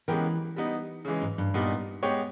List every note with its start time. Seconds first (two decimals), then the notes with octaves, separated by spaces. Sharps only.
0.08 C#3 E3 G#3 B3 G4 A#4
0.56 G3 B3 D#4
1.05 C#3 E3 G#3
1.22 G#2
1.38 G2
1.54 A#2 G3 B3 D#4
2.03 G#3 B3 G4 C#5